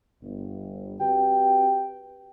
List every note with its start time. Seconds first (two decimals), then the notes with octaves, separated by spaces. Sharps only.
0.22 G1
1.00 C4 F#4 G4 B4 G5